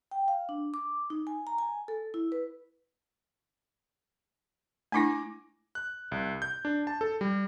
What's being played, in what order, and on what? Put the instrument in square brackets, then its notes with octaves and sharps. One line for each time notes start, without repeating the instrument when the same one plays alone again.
[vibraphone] G5
F5
D4
D6
D#4
G#5
A#5
G#5
A4
E4
B4
[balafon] A3 D4 E4 [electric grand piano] G#5 D6 A#6
[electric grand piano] F#6
C2
G6
D4
A5
A4
G3